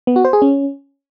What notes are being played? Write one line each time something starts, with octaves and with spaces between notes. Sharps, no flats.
B3
F#4
C5
G#4
C#4